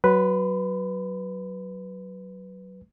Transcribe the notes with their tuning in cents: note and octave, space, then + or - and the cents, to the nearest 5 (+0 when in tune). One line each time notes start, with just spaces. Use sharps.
F#3 +15 B4 +0 C6 -40